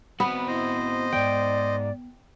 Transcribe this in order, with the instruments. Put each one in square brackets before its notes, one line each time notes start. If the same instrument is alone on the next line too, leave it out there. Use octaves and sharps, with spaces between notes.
[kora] B3 [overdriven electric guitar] C4 F#4 [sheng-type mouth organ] B4
[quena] E4 [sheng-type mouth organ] C5 D#5
[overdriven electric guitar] D2 G#2 [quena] D5 [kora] G5